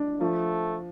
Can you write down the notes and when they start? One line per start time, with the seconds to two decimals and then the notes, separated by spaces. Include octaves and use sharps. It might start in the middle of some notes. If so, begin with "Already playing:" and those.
Already playing: D4
0.20 F3 A3